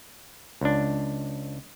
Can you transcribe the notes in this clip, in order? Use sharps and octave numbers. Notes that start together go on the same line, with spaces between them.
C#2 D4